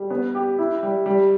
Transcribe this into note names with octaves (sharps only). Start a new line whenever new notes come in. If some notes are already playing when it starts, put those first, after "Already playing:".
Already playing: G3
B3
G4
E4
G3
G3